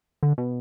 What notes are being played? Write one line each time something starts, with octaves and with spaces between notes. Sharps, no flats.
D3
B2